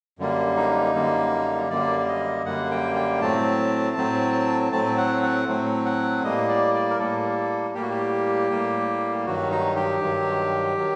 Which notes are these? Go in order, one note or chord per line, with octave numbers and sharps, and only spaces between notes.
F#2 D3 G3 A#3
D#4
F#2 D3 G3 A#3
F#2 D3 G3 A#3 D5
D5
D#5
F#2 D3 G3 A#3 F#5
G5
G5
A2 F#3 A3 C4 A5
A2 F#3 A3 C4
A2 F#3 A3 C4 A5
F#5
F#5
A2 F#3 A3 C4
F#5
A2 G3 A#3 D#5
D5
D5
A#4
A2 G3 A#3 A4
A2 G3 A#3 G4
F#4
G4
A2 G3 A#3
G2 D#3 F#3 F#4
D#4
G4
G2 D#3 F#3
D#3 F#3